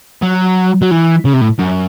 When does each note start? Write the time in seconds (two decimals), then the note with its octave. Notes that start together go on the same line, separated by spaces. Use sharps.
0.22 F#3
0.82 F#3
0.91 E3
1.25 C#3
1.34 C3
1.41 A2
1.59 F#2